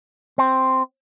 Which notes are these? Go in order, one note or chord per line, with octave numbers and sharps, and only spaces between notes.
C4